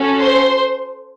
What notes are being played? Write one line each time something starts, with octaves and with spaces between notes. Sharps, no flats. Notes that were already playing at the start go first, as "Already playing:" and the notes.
Already playing: C#4 F#4 A4
C5 C6